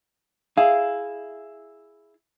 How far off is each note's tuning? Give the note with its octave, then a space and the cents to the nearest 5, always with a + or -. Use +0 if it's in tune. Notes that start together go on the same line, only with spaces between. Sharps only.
E4 +0 G#4 +0 F5 +0